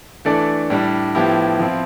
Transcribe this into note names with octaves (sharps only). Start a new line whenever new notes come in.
E3 A3 D4 A4 D5
A2 G3 D4
A2 F3 B3 E4 G4
F3 C4 E4